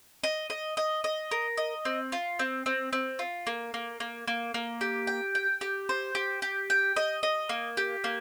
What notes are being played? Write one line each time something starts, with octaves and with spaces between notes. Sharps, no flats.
D#5
D#5
D#5
D#5
A#4
D#5
C4
F4
C4
C4
C4
F4
A#3
A#3
A#3
A#3
A#3
G4
G5
G5
G4
C5
G4
G4
G5
D#5
D#5
A#3
G4
A#3